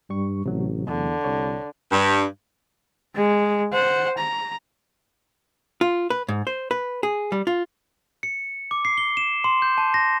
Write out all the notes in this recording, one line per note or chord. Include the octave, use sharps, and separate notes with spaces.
G2 G3 C#6
A1 C3 F#3 A3
E2 D3
C2 C#5
G2
G#3
C5 F#5
A#5
F4
B4
G#2
C5
B4
G#4
G3
F4
C#7
D6
C7
G7
E7
C6
G6
A5
A#6